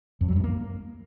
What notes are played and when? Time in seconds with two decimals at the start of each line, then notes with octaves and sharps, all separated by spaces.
0.21 F2
0.28 F#3
0.36 G2
0.44 A#3